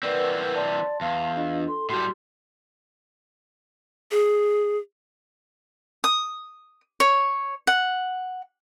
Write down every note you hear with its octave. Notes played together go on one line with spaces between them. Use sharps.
E3 C4 A#4 B4 D5 F#5
D5 A5 C6
E2 F5
D4 F4 D#5
A4 C6
A2 G3 F#4 G4 C6
G#4
D#6
C#5
F#5